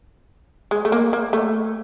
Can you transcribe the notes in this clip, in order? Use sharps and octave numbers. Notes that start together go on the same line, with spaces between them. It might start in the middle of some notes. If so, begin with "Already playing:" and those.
G#3
A3
A#3
A#3
A3